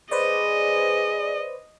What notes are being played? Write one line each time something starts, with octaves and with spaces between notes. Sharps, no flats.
G#4 B4 C5 D5 D#5